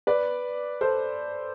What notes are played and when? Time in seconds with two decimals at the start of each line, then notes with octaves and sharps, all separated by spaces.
0.07 B4 D5
0.81 A4 C5